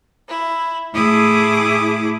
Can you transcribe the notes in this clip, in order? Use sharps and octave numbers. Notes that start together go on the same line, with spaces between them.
E4
A2 A3 E4 G#4 D6 D#6